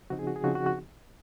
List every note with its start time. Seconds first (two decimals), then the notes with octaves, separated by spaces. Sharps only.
0.10 C#3 F3 C4 D#4 F#4
0.19 G#4
0.27 F#4
0.36 G#4
0.44 C#3 F3 C4 D#4 F#4
0.55 F#4
0.66 F#4